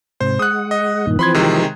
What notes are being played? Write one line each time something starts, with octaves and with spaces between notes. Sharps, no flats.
G#2 C3 C5
G#3 F#5 D#6 F#6
D#5
G2 A#2 D#3
E3 F3 C4 B5 C6 G#6
C3 D#3 G#3